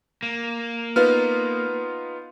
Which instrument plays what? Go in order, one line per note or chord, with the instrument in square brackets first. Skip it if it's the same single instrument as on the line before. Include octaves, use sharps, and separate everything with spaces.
[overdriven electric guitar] A#3
[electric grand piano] B3 D#4 F4 [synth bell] B4 F6